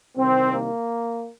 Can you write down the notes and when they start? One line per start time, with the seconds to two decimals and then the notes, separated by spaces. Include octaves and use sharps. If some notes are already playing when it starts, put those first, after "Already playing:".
0.17 C2 C3 D#3 C4
0.53 A#3